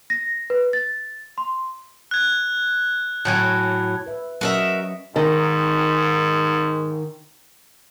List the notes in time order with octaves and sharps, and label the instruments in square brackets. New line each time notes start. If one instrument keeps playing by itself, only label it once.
[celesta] A#6
B4
A6
C6
[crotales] F#6 G#6
[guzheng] A2 F#3 G#5
[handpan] B4 E5
[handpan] F#3 C#4 D#5 [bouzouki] F#4 A#4 E5
[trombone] G#2 [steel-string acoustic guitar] D#3